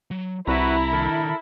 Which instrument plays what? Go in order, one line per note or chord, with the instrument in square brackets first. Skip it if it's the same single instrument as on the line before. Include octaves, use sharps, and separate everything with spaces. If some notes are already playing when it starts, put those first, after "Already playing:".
[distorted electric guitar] F#3
[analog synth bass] C2 [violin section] E4 [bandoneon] F#4 B4 [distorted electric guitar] A5 A#5
[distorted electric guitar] D#3 D4 [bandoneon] A4 A#4